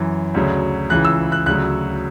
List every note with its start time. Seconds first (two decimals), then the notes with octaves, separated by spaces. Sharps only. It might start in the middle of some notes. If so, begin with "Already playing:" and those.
Already playing: F#2 E3
0.34 D2 C#3 F#3
0.90 C#2 C#3 E3 F#6
1.05 E6
1.32 F#6
1.46 D2 C#3 F#3 F#6